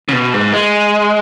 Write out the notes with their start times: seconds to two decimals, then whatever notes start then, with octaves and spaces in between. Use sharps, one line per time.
0.09 C#3
0.13 B2
0.34 G#2
0.54 G#3